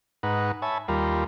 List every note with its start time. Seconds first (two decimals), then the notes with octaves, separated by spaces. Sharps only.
0.23 G#2 D#4 B4 F#5
0.62 C#5 E5 G#5 A5 B5
0.88 D#2 G3 F4 A#4 B5